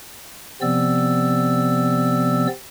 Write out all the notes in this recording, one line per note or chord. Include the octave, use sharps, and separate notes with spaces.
C3 F3 B3 C4 D5 E6